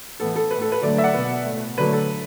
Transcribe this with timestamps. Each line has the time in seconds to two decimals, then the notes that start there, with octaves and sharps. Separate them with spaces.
0.20 A2 E3 B3 A4
0.36 A4
0.51 A2 A3 B4
0.61 A4
0.72 B4
0.82 D3 F#3 A3 A4 D5
0.98 E5
1.03 D5 F#5
1.13 B2 B3 B4
1.45 A2 A3
1.78 D3 F#3 A3 B4
1.92 A4